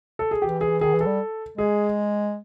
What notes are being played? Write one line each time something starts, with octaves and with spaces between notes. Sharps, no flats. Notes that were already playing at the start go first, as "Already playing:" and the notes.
A4
G#4
E3 G4
G#4
D#3 G#4
E3
A4
G3
G#3 G#4